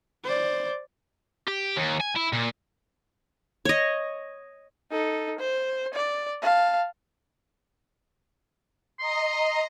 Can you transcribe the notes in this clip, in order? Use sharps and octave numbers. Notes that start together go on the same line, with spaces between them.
C5 D5
G4
D#2
G#5
E4
A#2
C#5 D#5
D#4 A4
C5
D5
F5 A5
D#5 A#5 C6